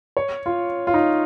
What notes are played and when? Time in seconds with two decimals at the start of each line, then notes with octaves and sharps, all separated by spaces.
0.17 C#5
0.46 F4
0.87 F4
0.94 D#4